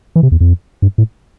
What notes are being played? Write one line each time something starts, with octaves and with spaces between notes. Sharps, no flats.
E3
C3
E2
F2
G2
A2